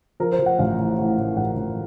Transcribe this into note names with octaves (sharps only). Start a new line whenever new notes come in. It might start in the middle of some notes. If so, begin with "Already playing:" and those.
F3 A#4
C5
F3
F#5
A1 F5
A2
A2
A2
A1 F#5
A1